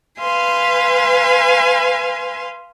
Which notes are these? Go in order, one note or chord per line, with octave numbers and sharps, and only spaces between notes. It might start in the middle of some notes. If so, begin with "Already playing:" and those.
B4 F5 G#5 C6